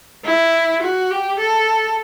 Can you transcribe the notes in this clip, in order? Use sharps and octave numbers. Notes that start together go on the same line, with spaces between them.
E4
F#4
G4
A4